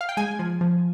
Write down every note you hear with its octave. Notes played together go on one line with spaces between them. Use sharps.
F5
G5
G#3 G#5
F3
F3